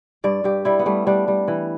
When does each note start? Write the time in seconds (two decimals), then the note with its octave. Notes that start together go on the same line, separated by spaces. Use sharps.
0.24 G2 D5
0.44 G2 G4
0.65 G3 E4
0.79 B3
0.86 G3 A3
1.07 G3 D4
1.28 G3
1.48 E3